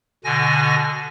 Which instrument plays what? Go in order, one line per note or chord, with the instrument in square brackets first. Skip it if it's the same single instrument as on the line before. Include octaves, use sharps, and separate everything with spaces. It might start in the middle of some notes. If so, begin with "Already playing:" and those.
[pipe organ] B2 D3 G#5 A#6